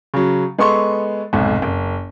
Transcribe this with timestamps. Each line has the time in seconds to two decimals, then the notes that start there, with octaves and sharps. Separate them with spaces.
0.14 C#3 F#3
0.58 G#3 B3 A4 C6 C#6
1.33 F1 B1 G#2
1.62 F#1